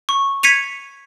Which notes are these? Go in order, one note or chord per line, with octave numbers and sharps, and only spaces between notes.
C#6
G#6 B6 C#7 D#7 F7